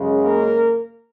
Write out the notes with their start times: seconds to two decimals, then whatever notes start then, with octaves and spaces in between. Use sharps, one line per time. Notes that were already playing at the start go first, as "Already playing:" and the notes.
Already playing: F#2 C#3 G#3
0.22 A#3 A#4